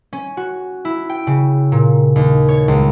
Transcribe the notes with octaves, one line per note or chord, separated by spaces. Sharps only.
C#4
F#4
E4
G5
C#3
A#2
D#2
C#5
C#2